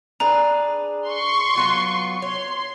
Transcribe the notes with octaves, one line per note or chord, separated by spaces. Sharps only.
D4 G#4 B4 A#5
C6 C#6
F#3 B3 F4
C#5 C6